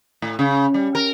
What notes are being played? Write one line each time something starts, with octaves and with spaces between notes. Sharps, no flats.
A2
C#3
G3
A#4